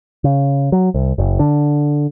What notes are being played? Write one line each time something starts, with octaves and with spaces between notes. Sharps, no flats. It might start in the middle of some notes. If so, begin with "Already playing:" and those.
C#3
F#3
C2
F#1
D3